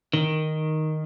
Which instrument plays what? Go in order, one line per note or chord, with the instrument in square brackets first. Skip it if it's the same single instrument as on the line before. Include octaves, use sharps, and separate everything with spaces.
[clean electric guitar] D#3